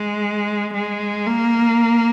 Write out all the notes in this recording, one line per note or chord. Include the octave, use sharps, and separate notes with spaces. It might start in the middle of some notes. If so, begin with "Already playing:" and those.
Already playing: G#3
G#3
A#3